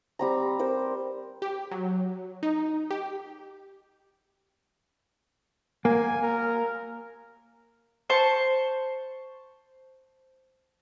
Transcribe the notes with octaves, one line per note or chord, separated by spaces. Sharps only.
G3 C4 A#5
A#4 C5
G4
F#3
D#4
G4
A#3 G#5
A#4
C5 A5 C#6